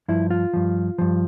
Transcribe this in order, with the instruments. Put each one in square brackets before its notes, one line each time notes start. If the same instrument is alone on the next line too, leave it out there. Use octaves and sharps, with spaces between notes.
[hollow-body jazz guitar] G2 F3 E4
F4
G2 F3
G2 F3